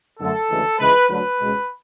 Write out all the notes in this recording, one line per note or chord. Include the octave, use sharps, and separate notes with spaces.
F#2 D3 A3 A4
D2 C#3 E3 G#3
C#2 C#3 E3 G#3 B4
D2 D3 F#3 B4
C#2 B2 G#3